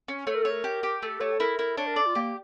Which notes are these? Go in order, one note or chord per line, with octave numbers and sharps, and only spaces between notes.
C#4
A3 C#5
A#4
A4 C#5
A#4
G4
G4
A3 A4
A3 C#5
E4 A#4
E4 A#4
D4 C#5
A#4
A4 D5
F4
A#3 G4